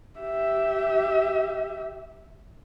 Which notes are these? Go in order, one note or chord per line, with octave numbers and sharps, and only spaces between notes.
G4 E5